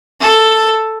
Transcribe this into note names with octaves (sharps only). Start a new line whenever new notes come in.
A4